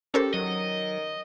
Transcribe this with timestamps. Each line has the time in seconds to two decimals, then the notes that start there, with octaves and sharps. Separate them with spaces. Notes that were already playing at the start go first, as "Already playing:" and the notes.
0.14 C#4 G4 A4 A#4 C5
0.34 D#3 F#3 D#5